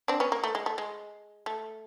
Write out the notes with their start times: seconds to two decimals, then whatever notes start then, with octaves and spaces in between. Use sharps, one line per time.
0.08 C4 D4
0.20 B3 C#4
0.32 A#3
0.44 A3
0.55 G#3
0.66 A3
0.78 G#3
1.46 A3